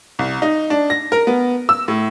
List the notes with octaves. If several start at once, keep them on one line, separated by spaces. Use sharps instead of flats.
C2
D#4
D4
A#6
A#4
B3
E6
A2